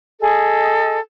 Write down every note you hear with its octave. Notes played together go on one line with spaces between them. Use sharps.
G#4 A4 D#5